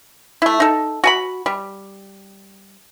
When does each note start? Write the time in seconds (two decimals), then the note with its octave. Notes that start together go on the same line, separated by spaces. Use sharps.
0.42 A3 E4
0.60 D#4 A4
1.04 F#4 G#5 B5
1.46 G3